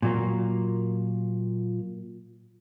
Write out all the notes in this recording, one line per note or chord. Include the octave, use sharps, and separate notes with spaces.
A#2 F#3 A#3